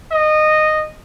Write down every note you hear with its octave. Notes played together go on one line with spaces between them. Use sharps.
D#5